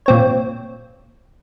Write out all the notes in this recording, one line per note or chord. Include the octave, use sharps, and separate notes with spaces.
A#2 C4 C#5